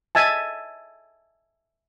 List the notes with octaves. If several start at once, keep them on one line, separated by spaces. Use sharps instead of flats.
D#5 E5 G#5 A5